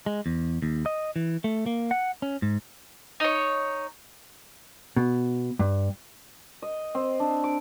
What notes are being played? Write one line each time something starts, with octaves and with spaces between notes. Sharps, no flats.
G#3
E2
D#2
D#5
E3
A3
A#3
F#5
C#4
G#2
D#4 C#5
B2
G2
D#5
C4
D4
D6